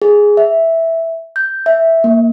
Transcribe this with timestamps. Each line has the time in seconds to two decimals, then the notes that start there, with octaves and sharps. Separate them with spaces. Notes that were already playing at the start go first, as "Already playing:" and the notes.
0.02 G#4
0.37 E5
1.36 G6
1.66 E5
2.04 A#3